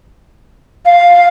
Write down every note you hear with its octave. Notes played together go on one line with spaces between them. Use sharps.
F5